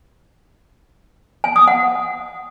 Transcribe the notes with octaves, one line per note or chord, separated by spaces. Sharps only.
G#5
D#6
F#5